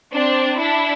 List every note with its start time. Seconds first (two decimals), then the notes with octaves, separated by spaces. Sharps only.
0.13 C4 D4
0.59 D4 E4